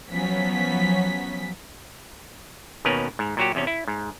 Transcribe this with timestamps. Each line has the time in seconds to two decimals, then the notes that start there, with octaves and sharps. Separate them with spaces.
0.12 F3 F#3 B3 C#4 B6
2.85 D#2 B2 C#4 A#4 B4
3.19 G#2
3.37 A#2 F#3 F#4 G4
3.55 E2 C3 C#4
3.67 E4
3.88 G#2